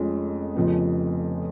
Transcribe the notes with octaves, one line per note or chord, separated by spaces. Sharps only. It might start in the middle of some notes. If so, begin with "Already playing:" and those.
Already playing: F1 F2 F3 G#3 C#4
F1 F2 C#3 F3 B3